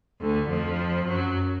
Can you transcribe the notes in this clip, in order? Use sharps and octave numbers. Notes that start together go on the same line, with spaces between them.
D2 D3
F2 F3
F#2 F#3